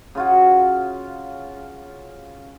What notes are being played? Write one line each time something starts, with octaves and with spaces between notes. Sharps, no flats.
C#3 F4 F#4